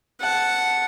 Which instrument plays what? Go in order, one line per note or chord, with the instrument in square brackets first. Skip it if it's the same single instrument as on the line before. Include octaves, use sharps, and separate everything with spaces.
[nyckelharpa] F#5 A5